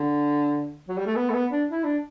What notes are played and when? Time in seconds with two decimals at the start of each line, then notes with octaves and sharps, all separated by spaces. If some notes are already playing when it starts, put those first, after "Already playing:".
Already playing: D3
0.88 F#3
0.97 G3
1.07 A3
1.16 B3
1.29 A3
1.34 B3
1.52 D4
1.70 E4
1.84 D4